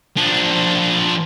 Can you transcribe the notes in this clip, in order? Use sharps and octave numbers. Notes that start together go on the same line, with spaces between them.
F3 D4